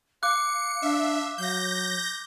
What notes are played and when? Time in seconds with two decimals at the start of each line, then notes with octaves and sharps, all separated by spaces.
0.23 F5 D6 F#6 C#7
0.82 D4 E5
1.38 F#3 G6 A#6